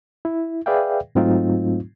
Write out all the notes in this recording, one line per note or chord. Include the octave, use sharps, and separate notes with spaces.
E4
G#4 B4 D5 E5 F5 G5
G#2 F#3 A3 C4 D#4 F4